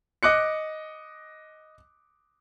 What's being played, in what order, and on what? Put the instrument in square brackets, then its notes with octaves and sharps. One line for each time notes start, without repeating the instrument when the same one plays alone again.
[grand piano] D#5 D6 F#6 C#7